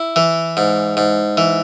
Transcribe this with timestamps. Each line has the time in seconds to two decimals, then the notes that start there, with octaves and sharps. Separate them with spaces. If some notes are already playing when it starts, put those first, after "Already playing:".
Already playing: E4
0.16 E3
0.57 G#2
0.97 G#2
1.37 E3